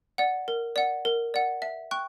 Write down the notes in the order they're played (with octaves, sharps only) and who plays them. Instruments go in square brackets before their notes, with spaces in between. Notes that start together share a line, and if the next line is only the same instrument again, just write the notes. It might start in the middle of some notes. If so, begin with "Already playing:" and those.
[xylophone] D5 F#5
A#4
D5 F#5
A#4
D5 F#5
E5
G5 C#6 F#6